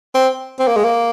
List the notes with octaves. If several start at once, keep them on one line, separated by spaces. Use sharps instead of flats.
C4
C4
A#3
G#3
A#3